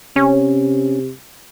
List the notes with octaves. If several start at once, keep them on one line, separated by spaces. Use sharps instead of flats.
C3 C#4